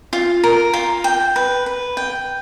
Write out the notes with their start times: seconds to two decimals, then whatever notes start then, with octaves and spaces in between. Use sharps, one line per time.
0.13 F4
0.44 A#4
0.73 F4
1.04 G5
1.36 B4
1.66 B4
1.97 G5